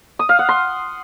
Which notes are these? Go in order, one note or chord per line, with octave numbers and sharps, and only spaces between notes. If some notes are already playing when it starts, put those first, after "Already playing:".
D#6
F5
F#5
C6